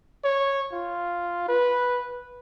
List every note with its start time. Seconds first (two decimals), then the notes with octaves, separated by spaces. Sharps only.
0.24 C#5
0.72 F4
1.48 B4